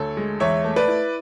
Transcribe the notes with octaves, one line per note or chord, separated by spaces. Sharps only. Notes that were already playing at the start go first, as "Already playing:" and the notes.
Already playing: D2 A4 C#5
G#3
E2 C#5 E5
A3
B4 D5
E4